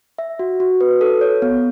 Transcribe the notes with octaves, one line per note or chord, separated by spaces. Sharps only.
E5
F#4
F#4
B4
A4
C#5
B3